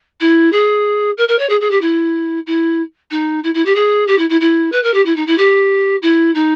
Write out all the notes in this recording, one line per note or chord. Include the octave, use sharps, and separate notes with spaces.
E4
G#4
A#4
A#4
C#5
G#4
G#4
G4
E4
E4
D#4
E4
E4
G4
G#4
G4
E4
E4
E4
B4
A#4
G4
E4
D#4
E4
G4
E4
D#4